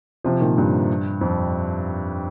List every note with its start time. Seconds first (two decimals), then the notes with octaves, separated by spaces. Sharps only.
0.24 C3 F3
0.41 A#2 D#3
0.58 G2
1.21 F2